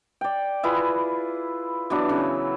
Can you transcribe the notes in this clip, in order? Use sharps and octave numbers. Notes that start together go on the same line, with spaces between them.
D5 G5
E4 F4 G#4 B4
E3 F#3 B3 D4
C#3